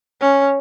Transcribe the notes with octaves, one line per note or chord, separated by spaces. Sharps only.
C#4